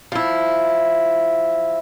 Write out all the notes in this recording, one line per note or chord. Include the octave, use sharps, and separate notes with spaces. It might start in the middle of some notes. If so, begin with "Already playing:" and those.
F3 E4